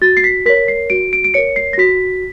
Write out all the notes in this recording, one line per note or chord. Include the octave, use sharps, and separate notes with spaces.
F#4 A6
C7
B6
A#4 C#5 B6
C7
F#4 D7
D7
D7
A#4 C#5 C#7
C7
A#6
F#4 B6